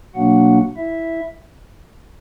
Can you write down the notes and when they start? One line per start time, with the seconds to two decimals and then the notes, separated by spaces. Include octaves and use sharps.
0.15 B2 F#3 A#3 D4 F#4 F#5
0.77 E4 E5